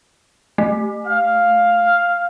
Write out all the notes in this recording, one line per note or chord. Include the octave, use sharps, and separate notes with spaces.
A3
F5